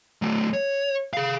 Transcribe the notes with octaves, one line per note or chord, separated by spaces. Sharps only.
F#3 A3
C#5
G#4 F5